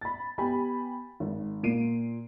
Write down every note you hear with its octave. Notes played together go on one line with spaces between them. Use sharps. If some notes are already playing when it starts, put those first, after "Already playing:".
B5 A6
B3 G4 G5 G#5 B5
G#1
A#2 A#3 C7 D7 D#7